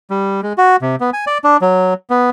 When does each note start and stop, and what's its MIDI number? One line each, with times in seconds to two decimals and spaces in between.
0.10 0.41 55
0.43 0.53 56
0.58 0.76 66
0.82 0.96 48
1.00 1.10 59
1.13 1.25 80
1.27 1.38 74
1.44 1.57 62
1.62 1.94 54
2.10 2.30 59